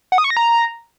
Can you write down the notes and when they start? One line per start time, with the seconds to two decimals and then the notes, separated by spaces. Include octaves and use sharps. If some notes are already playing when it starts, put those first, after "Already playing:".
0.12 F#5
0.18 D#6
0.24 C#6
0.30 A#6
0.37 A#5